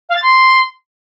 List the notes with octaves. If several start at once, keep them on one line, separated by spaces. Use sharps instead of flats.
F5
A6
C6